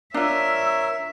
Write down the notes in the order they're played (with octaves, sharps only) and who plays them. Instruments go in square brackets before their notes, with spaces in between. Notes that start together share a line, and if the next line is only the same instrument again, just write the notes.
[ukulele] D4 F4 [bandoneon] A#4 [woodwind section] C#5 E6 [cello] E5